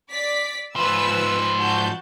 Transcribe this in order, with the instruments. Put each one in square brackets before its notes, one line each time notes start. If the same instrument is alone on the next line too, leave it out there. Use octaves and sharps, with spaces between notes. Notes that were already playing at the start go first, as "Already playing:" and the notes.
[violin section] D5 B6
[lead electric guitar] G#2 F3 [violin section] B4 E6
[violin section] F#4 A5 G6